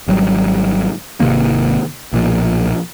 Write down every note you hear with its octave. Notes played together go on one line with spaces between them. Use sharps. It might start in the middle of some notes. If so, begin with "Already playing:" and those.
G#1 F#3 G3
G#1 C3 D#3 A#3
B1 A#2 F3